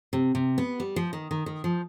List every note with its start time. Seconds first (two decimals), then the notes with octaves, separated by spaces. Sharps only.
0.13 C3
0.35 C3
0.58 B3
0.80 G3
0.96 F3
1.13 D#3
1.31 D#3
1.46 D#3
1.64 F3